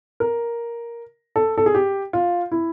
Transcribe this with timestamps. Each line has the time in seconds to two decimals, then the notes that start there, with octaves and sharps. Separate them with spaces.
0.20 A#4
1.36 A4
1.58 A4
1.66 G#4
1.75 G4
2.13 F4
2.52 E4